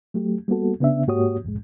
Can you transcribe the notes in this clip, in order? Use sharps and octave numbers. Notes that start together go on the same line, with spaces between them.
F#3 A3 G4
G3 A#3 B3 F#4 A4
C#3 B3 D4 E5
G#2 A#3 F#4 G4 C#5 D#6
C2 F2 A2 G#3